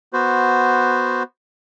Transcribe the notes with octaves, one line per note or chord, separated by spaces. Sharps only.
B3 F#4 C5